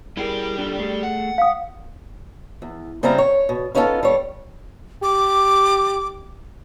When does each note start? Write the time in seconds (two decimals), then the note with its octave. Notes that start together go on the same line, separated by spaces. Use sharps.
0.17 G3 E4 G#4 A#4 G5
0.58 D4 F4 A4
0.79 A3 G#4 A4
1.03 F#5
1.38 F5 D#6
2.62 E2
3.03 C#3 G3 C4 E4 F5 A#5
3.18 C#5
3.49 B2
3.74 B3 C#4 D#4 F4 F#4 A4
4.03 G3 C#5
5.03 G4 D6